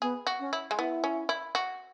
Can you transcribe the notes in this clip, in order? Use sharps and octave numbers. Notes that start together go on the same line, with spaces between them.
B3 G#4
F#4
C#4
E4
G#3
B3 E4
C#4
E4
F#4